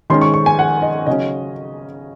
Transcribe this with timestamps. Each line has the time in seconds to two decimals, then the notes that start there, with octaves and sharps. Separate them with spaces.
0.10 D#3 G#3 C#4 C6
0.21 C#6
0.34 C#6
0.46 G#5
0.59 F#5
0.82 D#5
1.07 C#3 F#3 C#4 D#5